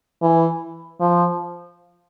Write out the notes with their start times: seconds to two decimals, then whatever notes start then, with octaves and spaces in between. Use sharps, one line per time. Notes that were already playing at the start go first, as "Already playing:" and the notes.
0.22 E3
1.01 F3